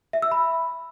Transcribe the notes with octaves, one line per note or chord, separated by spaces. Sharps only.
E5
E6
B5